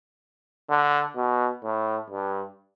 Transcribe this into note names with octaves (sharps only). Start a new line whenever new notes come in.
D3
B2
A2
G2